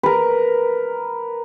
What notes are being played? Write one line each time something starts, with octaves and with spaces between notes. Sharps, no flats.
A#4 B4